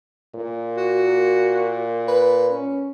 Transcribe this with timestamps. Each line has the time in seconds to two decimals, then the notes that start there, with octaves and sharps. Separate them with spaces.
0.35 A#2
0.77 F#4
2.08 B4
2.53 C#4